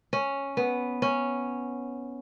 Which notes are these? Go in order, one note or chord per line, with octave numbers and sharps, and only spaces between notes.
C#4
B3
C#4